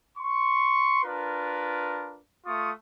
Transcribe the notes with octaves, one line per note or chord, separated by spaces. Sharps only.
C6 C#6
D4 F4 A#4 B4
A3 F4 C#6 D#6